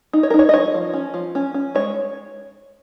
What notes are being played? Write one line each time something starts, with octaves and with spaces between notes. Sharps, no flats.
D#4
C#5
A#4
D#4 C#5
D#5
F3 C#5
F3
C#4
F3
C#4
C#4
G#3 C#5